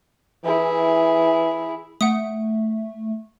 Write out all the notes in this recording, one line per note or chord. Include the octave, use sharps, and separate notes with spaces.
E3 E4 G#4
A3 F#5 D#6